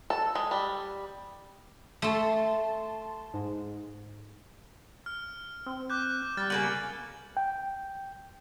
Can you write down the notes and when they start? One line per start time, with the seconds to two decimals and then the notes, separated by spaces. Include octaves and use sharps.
0.10 A4
0.35 G#3
0.51 G3
2.02 A3 A4 A5 C6
3.34 G#2
5.06 F6
5.66 C4
5.90 D6 F#6 G6
6.37 G3 F6 A6
6.50 C#3 A#3 B3 F#7
7.37 G5